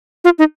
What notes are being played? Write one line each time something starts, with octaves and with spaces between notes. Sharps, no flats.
F4
D#4